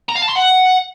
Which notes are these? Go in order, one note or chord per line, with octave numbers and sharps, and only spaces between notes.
A#5
F5
A5
C6
F#5